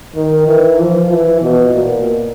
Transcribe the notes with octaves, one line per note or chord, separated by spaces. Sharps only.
D#3
E3
F3
E3
B2
A#2